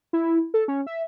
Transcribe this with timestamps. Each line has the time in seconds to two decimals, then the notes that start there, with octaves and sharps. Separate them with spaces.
0.13 E4
0.54 A4
0.68 C#4
0.87 E5